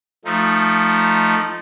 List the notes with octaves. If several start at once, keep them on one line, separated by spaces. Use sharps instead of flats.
F3 A3 D#4